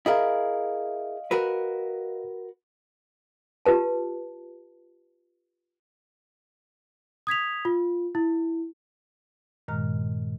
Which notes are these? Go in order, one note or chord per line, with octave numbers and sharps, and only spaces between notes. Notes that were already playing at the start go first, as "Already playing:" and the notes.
E4 G#4 A#4 D#5 F5
F#4 A#4 B4
F4 G4 B4 A5
D#6 G#6 B6 F7
F4
E4
G2 A#2 D#3 G#3 A#5 F6